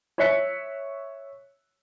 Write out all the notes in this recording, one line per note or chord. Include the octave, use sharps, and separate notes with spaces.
C#5 E5 F#6 B6 C#7